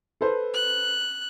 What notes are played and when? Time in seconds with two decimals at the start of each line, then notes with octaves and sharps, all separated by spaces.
0.21 A4 B4 C5
0.54 F#6